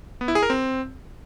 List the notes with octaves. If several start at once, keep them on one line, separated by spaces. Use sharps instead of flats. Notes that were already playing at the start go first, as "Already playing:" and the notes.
B3
E4
G#4
A#4
C4